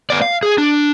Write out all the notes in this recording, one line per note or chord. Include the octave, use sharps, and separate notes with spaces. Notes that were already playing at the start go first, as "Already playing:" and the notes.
B3 D5
F5
G#4
D4